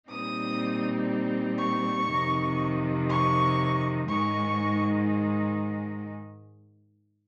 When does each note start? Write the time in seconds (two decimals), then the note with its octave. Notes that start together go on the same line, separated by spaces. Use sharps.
0.11 A#2 G3 C4 D#4 D#6
1.59 C#6
2.10 F2 C3 D#3
3.10 C#6
4.09 G#2 D#3 G#3 C#6